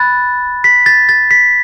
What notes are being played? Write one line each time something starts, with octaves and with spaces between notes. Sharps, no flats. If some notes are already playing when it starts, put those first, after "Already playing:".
Already playing: B5 F#6 A6
B6
A6
A6
B6